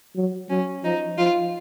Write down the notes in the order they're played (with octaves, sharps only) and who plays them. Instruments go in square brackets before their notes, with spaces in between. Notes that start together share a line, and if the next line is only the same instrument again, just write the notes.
[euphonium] F#3
[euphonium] F#3 [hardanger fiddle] C#4
[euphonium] F3 [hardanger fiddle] D#4
[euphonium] F3 [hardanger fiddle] F4